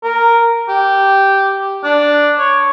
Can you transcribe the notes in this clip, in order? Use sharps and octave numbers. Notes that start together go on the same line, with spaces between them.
A#4
G4
D4
C#5